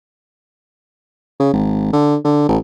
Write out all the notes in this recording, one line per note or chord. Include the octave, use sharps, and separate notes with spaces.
C#3
G#1
D3
D3
A1